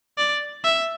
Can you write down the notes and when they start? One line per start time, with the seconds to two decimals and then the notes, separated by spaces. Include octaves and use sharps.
0.18 D5
0.64 E5